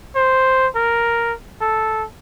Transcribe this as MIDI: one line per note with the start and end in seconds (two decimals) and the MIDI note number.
0.15 0.67 72
0.76 1.33 70
1.61 2.04 69